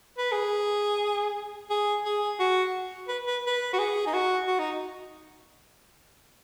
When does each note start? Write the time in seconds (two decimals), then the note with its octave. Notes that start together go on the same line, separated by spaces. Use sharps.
0.18 B4
0.32 G#4
1.70 G#4
2.05 G#4
2.40 F#4
3.08 B4
3.27 B4
3.46 B4
3.73 F#4
3.79 G#4
4.06 D#4
4.13 F#4
4.47 F#4
4.59 D#4